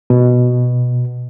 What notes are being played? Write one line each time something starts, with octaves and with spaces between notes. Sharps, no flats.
B2